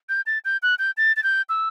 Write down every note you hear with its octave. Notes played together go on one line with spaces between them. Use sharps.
G6
A6
G6
F#6
G6
A6
A6
G6
E6